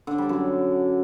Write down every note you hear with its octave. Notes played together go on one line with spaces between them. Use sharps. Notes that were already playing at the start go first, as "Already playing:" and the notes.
D3
G3
F#2